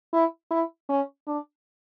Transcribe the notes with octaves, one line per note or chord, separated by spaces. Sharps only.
E4
E4
C#4
D4